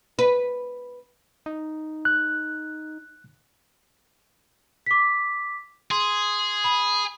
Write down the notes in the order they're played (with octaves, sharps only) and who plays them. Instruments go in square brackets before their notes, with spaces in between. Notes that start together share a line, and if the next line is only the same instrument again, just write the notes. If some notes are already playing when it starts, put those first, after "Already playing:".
[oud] B4
[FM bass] D#4
[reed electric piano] F#6
[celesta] D6 B6
[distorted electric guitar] G#4 [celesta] C6
[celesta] B5